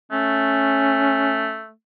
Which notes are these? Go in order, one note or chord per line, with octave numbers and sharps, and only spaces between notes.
A3 C#4